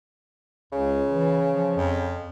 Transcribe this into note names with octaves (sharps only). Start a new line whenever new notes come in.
C#2 C#3
E3
F3
F2